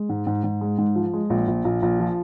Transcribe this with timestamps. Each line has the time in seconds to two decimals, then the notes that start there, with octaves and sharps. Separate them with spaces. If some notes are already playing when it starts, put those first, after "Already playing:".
Already playing: G#3
0.09 G#2
0.27 G#2
0.44 G#2
0.61 G#3
0.78 G#2
0.95 F3
1.13 G#3
1.30 A#1
1.48 A#1
1.65 A#1
1.82 A#1
2.00 F3